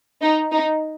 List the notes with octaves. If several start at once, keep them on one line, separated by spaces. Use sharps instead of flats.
D#4
D#4